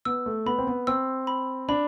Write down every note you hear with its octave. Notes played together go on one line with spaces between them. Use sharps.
B3 E6
A3
B3 B5
C4
B3
C4 E6
B5
D4 B5